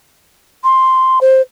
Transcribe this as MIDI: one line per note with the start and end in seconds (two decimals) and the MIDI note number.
0.64 1.19 84
1.21 1.41 72